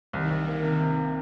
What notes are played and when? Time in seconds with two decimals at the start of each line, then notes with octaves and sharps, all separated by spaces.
0.13 C2 D#3
0.30 C2
0.47 A#3
0.63 C3
0.80 C3
0.97 A#3